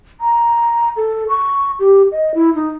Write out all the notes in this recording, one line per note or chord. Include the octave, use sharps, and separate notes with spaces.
A#5
A4
C#6
G4
D#5
E4
D#4